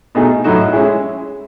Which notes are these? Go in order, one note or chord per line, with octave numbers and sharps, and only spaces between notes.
B2 A3 D#4 G#4
A2 F#3 A3 D#4 F#4
G#3 C#4 E4 G#4